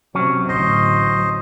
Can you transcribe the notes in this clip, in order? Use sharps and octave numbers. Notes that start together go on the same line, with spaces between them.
C3 F#3 C#4
A1 D2 C5 D#5